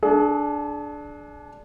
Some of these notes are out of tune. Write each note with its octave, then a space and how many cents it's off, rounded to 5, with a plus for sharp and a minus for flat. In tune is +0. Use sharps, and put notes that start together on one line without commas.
D4 +0 G#4 +35